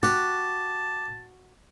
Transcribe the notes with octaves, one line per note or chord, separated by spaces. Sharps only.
F#4 G4 A5